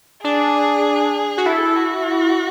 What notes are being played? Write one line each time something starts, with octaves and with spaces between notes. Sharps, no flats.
D4 G#4
F#4
E4 A4
F#4